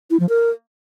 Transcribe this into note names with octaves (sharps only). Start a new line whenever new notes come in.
E4
F3
A#4